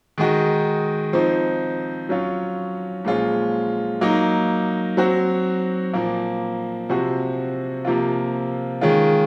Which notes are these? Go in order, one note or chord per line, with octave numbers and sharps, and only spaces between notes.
D#3 G#3 D#4 F#4
F3 C4 D#4
F#3 C#4 F4
A#2 F3 G#3 C#4 F4
F#3 A#3 D#4
F#3 C4 F#4
A#2 F3 A#3
C3 F3 C4 F#4
C3 F3 A#3 F4
D#3 G#3 C#4 F4